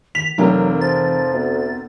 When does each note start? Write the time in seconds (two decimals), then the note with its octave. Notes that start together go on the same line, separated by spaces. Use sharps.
0.15 D#3 B6 F7
0.38 F1 C3 E3 F#3 A#3 A#4
0.81 F3 A6
1.34 D2 B3